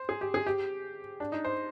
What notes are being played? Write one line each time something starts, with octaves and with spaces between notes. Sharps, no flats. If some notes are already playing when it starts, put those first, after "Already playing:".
Already playing: C5
G#4
G4
G#4
G4
D4
D#4
C5